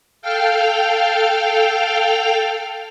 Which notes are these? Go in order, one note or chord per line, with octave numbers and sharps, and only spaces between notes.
A4 F5 G5 F6